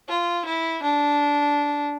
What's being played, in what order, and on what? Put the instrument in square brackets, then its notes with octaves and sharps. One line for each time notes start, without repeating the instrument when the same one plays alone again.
[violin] F4
E4
D4